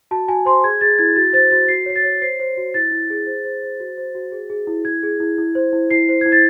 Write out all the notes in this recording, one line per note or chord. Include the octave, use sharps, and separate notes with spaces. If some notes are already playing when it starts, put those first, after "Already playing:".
F#4 A5
F#4 G#5
C5 C6
G#4 G#6
G#4 A6
E4 G#6
F#4 A6
C5 A6
F#4 A6
F#4 C7
C#5 C7
A6
C#5
C5 C7
C5
F#4
E4 A6
E4
G#4
C5
C5
C5
F#4
C5
F#4
G#4
G#4
E4
E4 G#6
G#4
E4
E4
C5
E4
E4 C7
C5
E4 G#6
A6